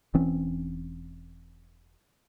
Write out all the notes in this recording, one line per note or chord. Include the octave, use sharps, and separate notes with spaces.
E1 E3 C4 C#4